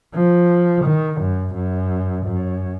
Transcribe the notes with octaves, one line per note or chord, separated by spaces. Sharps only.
F3
D#3
F#2
F#2
F#2